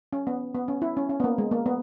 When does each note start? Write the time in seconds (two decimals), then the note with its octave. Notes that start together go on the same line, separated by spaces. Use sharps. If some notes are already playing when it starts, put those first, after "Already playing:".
0.13 C#4
0.27 B3
0.55 B3
0.68 C#4
0.82 E4
0.97 C#4
1.09 C#4
1.20 B3
1.24 A#3
1.38 G#3
1.51 A#3
1.66 B3